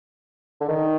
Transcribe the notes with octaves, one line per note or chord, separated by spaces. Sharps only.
D3
D#3